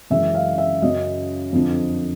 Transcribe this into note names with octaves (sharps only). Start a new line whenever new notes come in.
F#2 C#3 E3 G#3 E5
F5
E5
F#2 C#3 F#3 D#5
F2 D3 F3